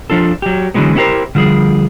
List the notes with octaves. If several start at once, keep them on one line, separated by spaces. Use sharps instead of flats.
F3 D4 F4 A4
F#3 G4
D3 E3 F#3 G#3 B3
B3 C#4 E4 G4 A#4 C5
D3 F3 G3 G#4